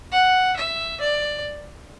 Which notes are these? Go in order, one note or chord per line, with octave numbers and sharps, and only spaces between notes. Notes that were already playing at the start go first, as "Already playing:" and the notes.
F#5
E5
D5